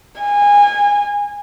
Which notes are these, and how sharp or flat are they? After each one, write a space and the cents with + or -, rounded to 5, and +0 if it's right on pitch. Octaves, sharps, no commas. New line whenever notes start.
G#5 -25